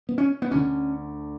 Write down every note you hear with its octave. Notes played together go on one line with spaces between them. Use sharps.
B3
C#4
B3
D2 D3 C#4